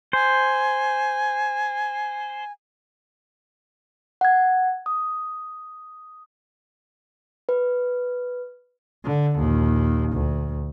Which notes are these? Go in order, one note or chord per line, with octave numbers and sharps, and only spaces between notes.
C5 G#5
F#5 G#6
D#6
B4
D3
A#1 D#2
D2